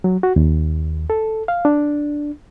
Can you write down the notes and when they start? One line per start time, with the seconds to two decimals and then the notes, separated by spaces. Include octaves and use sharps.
0.04 F#3
0.23 F#4
0.36 D#2
1.10 A4
1.48 F5
1.65 D4